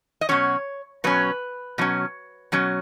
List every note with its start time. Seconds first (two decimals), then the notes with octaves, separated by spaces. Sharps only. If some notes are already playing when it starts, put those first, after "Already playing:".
0.21 D#5
0.29 B2 F#3 C#4 C#5
1.04 B2 F#3 C#4 B4
1.78 B2 F#3 C#4
2.52 B2 F#3 C#4